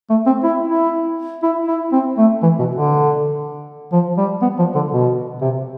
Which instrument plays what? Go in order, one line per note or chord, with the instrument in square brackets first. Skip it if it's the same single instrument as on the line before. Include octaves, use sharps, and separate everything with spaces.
[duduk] A3
C4
E4
E4
E4
E4
C4
A3
E3
B2
D3
F3
G3
B3
F3
D3
B2
C3